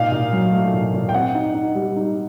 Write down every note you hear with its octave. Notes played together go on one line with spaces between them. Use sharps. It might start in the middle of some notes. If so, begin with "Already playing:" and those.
Already playing: A#2 D#4 F5
A#2
F#3
A3
A#2
A#2
G5
C4 F#5
D#4
D#4
G3
D#4